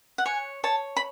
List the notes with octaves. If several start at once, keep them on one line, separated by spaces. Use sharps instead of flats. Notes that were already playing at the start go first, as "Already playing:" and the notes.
F#5
C#5 G#5
C#5 A5
B5